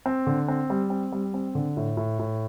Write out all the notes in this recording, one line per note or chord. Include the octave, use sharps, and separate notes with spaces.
C4
D3
C4
G3
C4
G3
C4
D3
A2
A2
A2